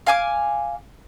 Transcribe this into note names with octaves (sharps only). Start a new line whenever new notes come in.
F5 G#5 D6